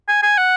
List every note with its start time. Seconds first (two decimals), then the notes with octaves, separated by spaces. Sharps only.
0.09 G#5
0.23 G#5
0.38 F#5